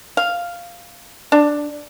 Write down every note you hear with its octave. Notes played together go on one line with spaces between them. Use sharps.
F5
D4